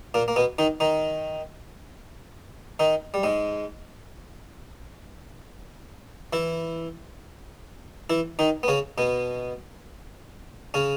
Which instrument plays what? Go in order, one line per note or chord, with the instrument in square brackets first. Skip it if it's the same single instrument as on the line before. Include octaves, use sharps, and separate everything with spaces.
[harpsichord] A#2 A#3
A#3
B2 B3
D#3 D#4
D#3 D#4
D#3 D#4
G3
G#2 G#3
E3 E4
E3 E4
D#3 D#4
B3
C#3 C#4
B2 B3
C#3 C#4